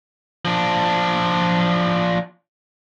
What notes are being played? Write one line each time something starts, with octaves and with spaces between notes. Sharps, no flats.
F3 D4